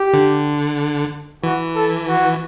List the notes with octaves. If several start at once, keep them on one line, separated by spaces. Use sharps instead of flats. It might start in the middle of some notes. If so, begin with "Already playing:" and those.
Already playing: G4
D3
E3 F#4
A4
F#4